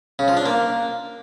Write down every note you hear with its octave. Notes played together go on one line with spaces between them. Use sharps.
C#3
F3
D4
A#3